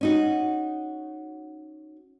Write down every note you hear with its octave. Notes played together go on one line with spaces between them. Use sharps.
C#4 D#4 F#4